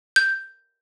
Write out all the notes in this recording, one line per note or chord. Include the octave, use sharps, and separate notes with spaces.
G6